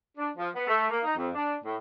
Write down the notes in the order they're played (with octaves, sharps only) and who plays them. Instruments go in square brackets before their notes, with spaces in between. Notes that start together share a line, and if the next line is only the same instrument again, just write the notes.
[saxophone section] D4
F3
B3
A3
A#3
D#4
F2
D4
A2